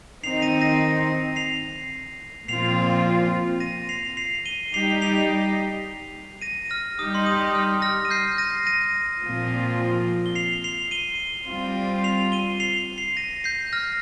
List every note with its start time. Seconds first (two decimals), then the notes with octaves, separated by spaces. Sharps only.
0.23 D#3 C4 D#4 C7 F7
0.42 A#6 D#7
0.61 A#6 D#7
1.36 C7 F7
2.48 A#2 F3 C4 F4 C7 F7
3.60 A#6 D#7
3.89 C7 F7
4.17 C7 F7
4.46 D#7 G7
4.74 G3 D#4 G4 C7 F7
5.01 C7 F7
6.42 A#6 D#7
6.70 F6 A#6
6.98 G3 D#4 G4 D#6
7.15 C6
7.26 D#6
7.55 F6
7.82 F6 A#6
8.05 D#7
8.11 G6 C7
8.38 A#6 D#7
8.67 A#6 D#7
9.23 A#2 F3 C4 F4
10.26 G7
10.35 C7 F7
10.64 C7 F7
10.91 D#7 G7
11.48 G3 C4 F4
12.04 C7 F7
12.32 D#7 G7
12.60 C7 F7
12.98 C7 F7
13.17 A#6 D#7
13.44 G6 C7
13.73 F6 A#6